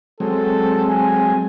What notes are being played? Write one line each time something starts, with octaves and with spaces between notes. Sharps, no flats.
F#3 G#3 C4 A4
G#5